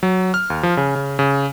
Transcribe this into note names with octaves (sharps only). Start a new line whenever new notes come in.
F#3
F6
D#2
F3
C#3
C#3
C#3